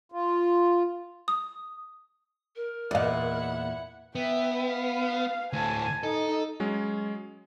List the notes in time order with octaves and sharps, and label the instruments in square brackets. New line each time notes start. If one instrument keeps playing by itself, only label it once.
[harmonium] F4
[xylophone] D#6
[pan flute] A#4
[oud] E2 A#2 [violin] E4 F#5 [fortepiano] D5 D#5 F5
[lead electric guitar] B3 [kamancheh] E5 G5
[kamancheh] F5
[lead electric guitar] D2 A2 [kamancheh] G#5 A5
[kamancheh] D#4 D#5 [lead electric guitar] A4
[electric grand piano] F#3 G#3 C#4